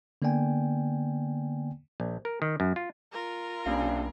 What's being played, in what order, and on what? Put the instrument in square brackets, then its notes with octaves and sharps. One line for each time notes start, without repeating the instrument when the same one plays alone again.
[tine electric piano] D3 A#3 B3 D5 G5 G#5
[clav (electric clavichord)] A#1
A#4
D#3
F#2
F4
[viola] F4 A#4
[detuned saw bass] B1 [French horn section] C3 D4 [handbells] A#3 C#4 F5